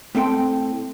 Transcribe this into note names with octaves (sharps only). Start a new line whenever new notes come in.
A2 C4 A4 G5 C6